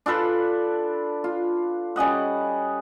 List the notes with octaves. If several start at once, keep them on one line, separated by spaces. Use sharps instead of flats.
D4 F4 A4 B4
F4
G3 C#4 D#5 F#5